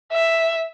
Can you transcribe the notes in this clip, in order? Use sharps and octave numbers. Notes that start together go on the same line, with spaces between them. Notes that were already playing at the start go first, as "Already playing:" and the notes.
E5